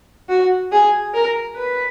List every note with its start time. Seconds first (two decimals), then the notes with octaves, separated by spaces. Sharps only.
0.29 F#4
0.72 G#4
1.14 A#4
1.56 B4